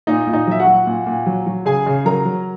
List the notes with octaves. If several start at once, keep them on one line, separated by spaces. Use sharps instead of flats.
A#2 D#4 D#5
A#2
D#4 D#5
F#3 E5
F#4 F#5
F#3
A#2
A#2
F#3
F#3
C#3 G#4 G#5
C#3
F#3 A#4 A#5
F#3